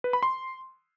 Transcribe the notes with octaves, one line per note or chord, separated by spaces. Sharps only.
B4
B5
C6